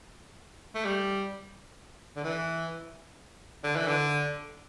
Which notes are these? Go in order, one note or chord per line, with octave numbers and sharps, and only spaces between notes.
A3
G3
D3
E3
D3
E3
D3